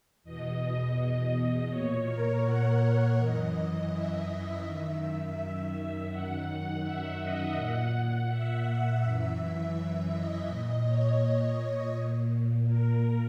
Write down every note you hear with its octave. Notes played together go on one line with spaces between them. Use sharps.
E2 B2 D#5
A#2 C#5
A#4
F#5
F#5
F#2 E3 D#5
E5
E5
F#2 D#3
F#2 D#3 F#5
F#5
E5
D#5
A#2 F#5
F#5
E5
F#2 E3
E5
D#5
A#2 D#5
C#5
A#2
A#4